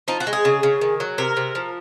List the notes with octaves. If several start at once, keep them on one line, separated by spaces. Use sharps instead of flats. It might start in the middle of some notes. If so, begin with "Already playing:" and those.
F3 D#4
F#4
G#3
G#4
C#3
C#3
D#3
F#3
C3 A#4
C3
F3